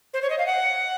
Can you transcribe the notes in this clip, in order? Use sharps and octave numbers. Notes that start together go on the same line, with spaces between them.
C5
C#5
D#5
F5
F#5